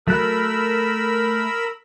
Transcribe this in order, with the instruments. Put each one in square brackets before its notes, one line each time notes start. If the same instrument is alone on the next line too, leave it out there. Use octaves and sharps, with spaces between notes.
[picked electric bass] F#3 [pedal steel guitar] A3 F#6 [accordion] A#4 B5 E6